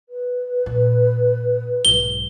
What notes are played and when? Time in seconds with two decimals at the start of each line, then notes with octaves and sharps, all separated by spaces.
0.09 B4
0.66 A#2
1.85 B1 G#2 G7